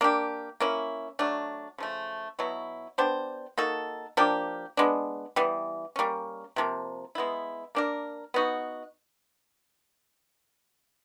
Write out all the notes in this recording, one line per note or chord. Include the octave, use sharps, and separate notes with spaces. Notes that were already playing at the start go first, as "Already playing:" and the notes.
A#3 D4 G4
A#3 C#4 E4
F#3 A3 D4
C#3 F3 A3
B2 F#3 B3 E4
B3 D4 G4 C5
A#3 D#4 F#4 A4
F3 A#3 D4 G4
G#3 B3 D4
E3 G3 B3
G3 A#3 C#4
C3 F3 A#3
G#3 B3 E4
A#3 D4 G4 A#4
B3 D#4 F#4